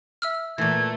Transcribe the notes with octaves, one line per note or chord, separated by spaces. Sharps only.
E5 E6 F6
A#2 E3 A3 G#6